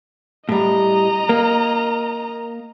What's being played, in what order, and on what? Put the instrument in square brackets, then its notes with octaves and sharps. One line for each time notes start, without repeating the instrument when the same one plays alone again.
[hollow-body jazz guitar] A2 G3 [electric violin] D#5 A#5
[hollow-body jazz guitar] A#3